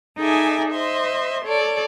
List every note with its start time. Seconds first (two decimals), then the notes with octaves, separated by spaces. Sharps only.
0.17 D#4 G#4 A4 D5 E5 G#5
0.71 C5 D#5 E5 C6
1.44 A4 C#5 D5